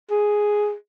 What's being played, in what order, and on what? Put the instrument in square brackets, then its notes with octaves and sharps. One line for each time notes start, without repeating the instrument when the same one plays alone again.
[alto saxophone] G#4